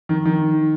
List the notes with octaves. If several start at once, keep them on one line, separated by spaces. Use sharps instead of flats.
D#3
D#3